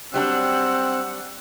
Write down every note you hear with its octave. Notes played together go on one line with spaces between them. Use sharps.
F#3 G3 C4 D4 F#5 E6